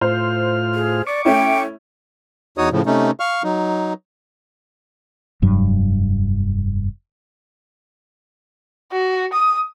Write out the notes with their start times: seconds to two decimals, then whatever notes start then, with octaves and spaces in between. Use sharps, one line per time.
0.01 A2 F4 C5 F6
0.75 G#4
1.07 D5 C#6 D6
1.25 A3 C#4 E4 G5
2.58 E2 D#4 F#4 C#5 D#6
2.72 A2 C#3 F3
2.86 C3 A3 C#4 D#4
3.20 F5 C#6 F6
3.44 F#3 D#4
5.42 F1 G2 F#3
8.92 F#4
9.33 D#6